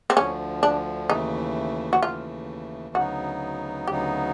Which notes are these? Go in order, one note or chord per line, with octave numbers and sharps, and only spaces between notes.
C4
D2 D3 F3 C#4
D4
D#2 C#3 E3 A3 D#4
F#4
D#2 C#3 E3 A3 F4
D2 C#3 F#3 B3 D#4 F#4
D2 C#3 F#3 B3 D#4 G4